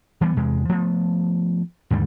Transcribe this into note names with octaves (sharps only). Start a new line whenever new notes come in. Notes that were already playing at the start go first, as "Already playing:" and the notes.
E3 G3 A3 B3
E2 C3 G#3
F3 A3 B3
D#2 G#2 D3 G3